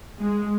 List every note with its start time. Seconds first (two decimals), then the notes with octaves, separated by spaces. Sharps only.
0.20 G#3